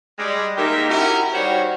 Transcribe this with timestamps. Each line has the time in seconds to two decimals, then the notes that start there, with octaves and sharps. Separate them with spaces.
0.19 G3 G#3
0.57 D#3 G#3 A#3 G4 A#4 E5
0.90 C#4 E4 F#4 G4 A#4
1.34 D#3 G3 F#4 C5 C#5